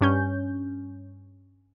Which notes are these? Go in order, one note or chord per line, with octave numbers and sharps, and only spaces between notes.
G2 C#4 G6